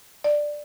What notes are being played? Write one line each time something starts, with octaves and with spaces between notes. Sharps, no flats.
D5